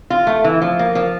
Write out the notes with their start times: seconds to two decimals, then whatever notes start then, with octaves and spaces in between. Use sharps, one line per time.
0.10 F4
0.27 A3
0.44 E3
0.62 F3
0.79 A#3
0.95 F3